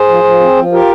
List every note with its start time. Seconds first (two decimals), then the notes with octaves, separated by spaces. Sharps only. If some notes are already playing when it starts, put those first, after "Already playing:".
Already playing: G#4 C5
0.08 F3
0.24 F3
0.40 C4
0.56 F3
0.72 F4 G4 A#4